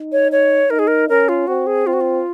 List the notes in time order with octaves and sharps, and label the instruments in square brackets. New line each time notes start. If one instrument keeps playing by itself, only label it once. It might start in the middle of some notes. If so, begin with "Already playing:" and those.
Already playing: [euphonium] D#4
[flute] C#5
C#5
[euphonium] D#4 [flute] A#4
[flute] G#4
A#4
[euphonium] C#4 [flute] A#4
[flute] F4
[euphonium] C4 [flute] F#4
[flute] G#4
[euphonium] C4 [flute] F4
[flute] F#4
F4